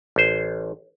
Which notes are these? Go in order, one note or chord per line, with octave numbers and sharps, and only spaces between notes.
A1 C5